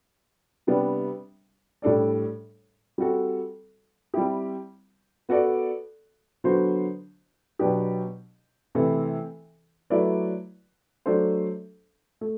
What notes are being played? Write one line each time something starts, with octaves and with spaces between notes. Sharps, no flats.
C3 G3 B3 D4
A2 G3 D4 A4 D5
G3 C4 F#4 A4
G3 C4 E4 G4
B3 F#4 A4 D5
D3 F#3 B3 F#4 C5
B2 F#3 B3 D4 G4
C3 E3 A3 E4 A4
F#3 A3 E4 B4 D5
F#3 A3 D4 A4 C5
A3